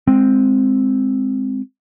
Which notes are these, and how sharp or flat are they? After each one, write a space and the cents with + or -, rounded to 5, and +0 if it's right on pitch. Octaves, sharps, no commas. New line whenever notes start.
G#3 +0 C4 +0